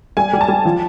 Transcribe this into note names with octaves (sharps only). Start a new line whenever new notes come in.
G3 G#5
G3
A5
G3
F3